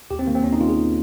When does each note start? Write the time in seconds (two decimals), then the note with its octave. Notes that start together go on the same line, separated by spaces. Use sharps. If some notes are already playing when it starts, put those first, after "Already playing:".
0.11 D#2 G4
0.19 C4
0.27 D#3 A#3
0.35 C4
0.44 D#2 C#4
0.53 D#4
0.60 D#3 F4
0.69 G#4
0.77 D#2